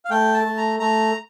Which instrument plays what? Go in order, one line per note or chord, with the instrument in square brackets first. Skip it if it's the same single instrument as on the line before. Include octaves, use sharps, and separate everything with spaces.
[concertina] F5
A3 G5
A5
A3
A#5
A3 A#5